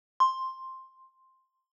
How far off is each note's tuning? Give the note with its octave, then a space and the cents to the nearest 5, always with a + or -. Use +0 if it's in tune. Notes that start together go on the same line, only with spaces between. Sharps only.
C6 +5